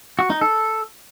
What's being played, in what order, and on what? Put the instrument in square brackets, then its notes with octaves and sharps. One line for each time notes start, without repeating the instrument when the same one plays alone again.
[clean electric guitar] F#4
D#4
A4